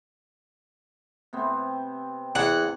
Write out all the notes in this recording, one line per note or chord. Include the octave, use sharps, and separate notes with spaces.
C3 B3 C4
E2 F#5